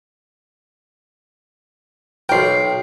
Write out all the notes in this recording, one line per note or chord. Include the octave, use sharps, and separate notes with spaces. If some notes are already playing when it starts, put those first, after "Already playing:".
B1 A#4 G5 C7